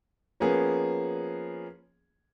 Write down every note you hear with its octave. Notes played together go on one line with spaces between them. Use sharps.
F3 A#3 B3 C#4 G#4